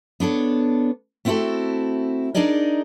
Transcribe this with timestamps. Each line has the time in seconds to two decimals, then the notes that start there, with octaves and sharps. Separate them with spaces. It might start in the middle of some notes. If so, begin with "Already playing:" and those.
0.20 B3 D4 A4 C#5
1.25 A3 B3 C4 E4 F#4 A4
2.35 D4 D#4 G#4 A#4 D5 D#5